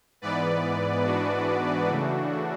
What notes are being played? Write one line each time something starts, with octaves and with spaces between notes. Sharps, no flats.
G#2 E3 B3 B4 D5
D4 F#4
C#3 E3 A3